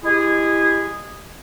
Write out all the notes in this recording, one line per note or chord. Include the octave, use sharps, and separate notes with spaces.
G#3 E4 G4 G#4